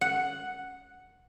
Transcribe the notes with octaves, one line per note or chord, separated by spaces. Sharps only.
F#5